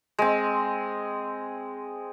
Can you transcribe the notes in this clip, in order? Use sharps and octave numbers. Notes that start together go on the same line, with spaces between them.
G#3 C4